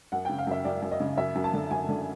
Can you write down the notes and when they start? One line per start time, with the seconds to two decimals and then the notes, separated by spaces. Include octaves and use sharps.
0.12 F#2 F#5
0.25 G5
0.29 C#3
0.38 F5
0.47 F#2 E5
0.65 F#2 D5
0.82 F#2
0.91 D#5
1.00 C#3
1.18 F#2 E5
1.35 F#2
1.44 A5
1.53 D3
1.71 F#2 G#5
1.89 D3